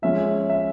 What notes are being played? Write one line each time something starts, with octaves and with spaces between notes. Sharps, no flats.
F3 G#3 C#4 E5
E5